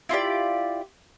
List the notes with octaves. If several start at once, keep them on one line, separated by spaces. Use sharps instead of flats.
E4 F4 G4 D5